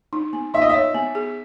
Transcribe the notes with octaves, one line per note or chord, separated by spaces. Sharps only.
D#4
B3
D#4 E5
D#5
C#5 E5
B3
G#4